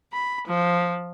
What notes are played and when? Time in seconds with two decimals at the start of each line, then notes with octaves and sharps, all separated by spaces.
0.12 B5
0.47 F3